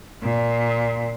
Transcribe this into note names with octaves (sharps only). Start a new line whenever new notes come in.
A#2